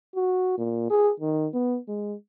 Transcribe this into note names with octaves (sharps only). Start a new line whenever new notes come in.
F#4
A#2
G#4
D#3
B3
G#3